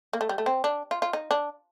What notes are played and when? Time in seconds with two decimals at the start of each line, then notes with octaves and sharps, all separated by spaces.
0.13 A#3
0.21 A3
0.29 G3
0.38 A3
0.46 C4
0.64 D4
0.91 F4
1.02 F4
1.13 D#4
1.31 D4